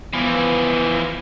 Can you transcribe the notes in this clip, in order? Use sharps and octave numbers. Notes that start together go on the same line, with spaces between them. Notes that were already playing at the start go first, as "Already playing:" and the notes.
E3 F3 B3